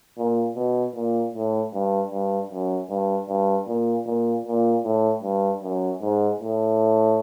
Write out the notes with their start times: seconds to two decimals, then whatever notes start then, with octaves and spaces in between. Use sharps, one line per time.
0.18 A#2
0.56 B2
0.95 A#2
1.34 A2
1.73 G2
2.12 G2
2.50 F#2
2.90 G2
3.29 G2
3.67 A#2
4.06 A#2
4.46 A#2
4.84 A2
5.23 G2
5.63 F#2
6.01 G#2
6.40 A2